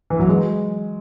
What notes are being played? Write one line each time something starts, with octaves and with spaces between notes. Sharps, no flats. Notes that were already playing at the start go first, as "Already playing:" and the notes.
E3
F#3
G#3